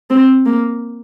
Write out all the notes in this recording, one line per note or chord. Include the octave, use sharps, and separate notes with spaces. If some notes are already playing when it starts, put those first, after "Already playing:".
C4
A#3